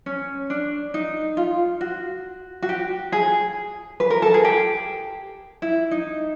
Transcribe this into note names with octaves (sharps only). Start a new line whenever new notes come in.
C#4
D4
D#4
F4
F#4
F#4
G4
G#4
B4
A#4
A4
G#4
G4
E4
D#4